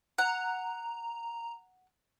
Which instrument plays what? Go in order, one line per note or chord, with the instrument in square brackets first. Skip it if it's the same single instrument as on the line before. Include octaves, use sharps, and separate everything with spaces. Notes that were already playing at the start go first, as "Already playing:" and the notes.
[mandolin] F#5 [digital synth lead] A#5